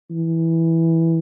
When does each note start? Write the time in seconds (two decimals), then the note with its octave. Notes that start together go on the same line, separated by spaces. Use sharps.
0.10 E3